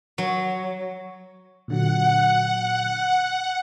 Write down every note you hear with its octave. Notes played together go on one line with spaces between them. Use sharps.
F#3
A#2 D3 F#3 F#5